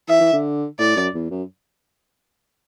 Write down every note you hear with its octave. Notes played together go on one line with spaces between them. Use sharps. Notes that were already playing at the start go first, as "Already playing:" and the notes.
E3 E5
E3
D3
A2 D5
F#2
E2
F#2